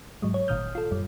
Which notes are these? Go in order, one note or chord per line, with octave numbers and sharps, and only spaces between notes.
G#2 F#3 G#3
C#5
G1 A#2 D#3 D#6 F6 G6
F4 A4
F#2 G3